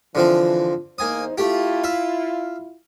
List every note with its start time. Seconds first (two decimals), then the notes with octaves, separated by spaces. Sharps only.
0.15 D3 E3 F3 C4
0.98 E2 A#3 D#4 C5 G#5 D#6
1.38 A3 E4 F4 G4
1.84 E5 F5